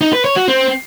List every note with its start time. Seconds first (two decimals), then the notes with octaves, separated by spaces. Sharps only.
0.01 D#4
0.13 B4
0.25 C#5
0.36 F#4
0.48 C4